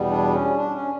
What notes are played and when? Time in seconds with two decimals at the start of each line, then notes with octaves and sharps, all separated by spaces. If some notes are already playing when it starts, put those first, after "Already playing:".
Already playing: E2 B2 G3 B3
0.10 D4
0.34 C#4
0.57 D4
0.74 C#4